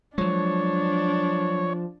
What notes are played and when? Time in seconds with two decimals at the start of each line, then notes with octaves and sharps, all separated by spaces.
0.18 F3 F#3 G#3 D4 C#5